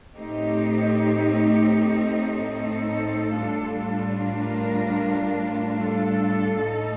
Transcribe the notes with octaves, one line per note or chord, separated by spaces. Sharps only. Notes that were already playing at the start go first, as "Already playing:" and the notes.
A2 A3 C4 D#4 G4
A4
A2 G3 D4 F4
A#4
A4
A2 A3 D#4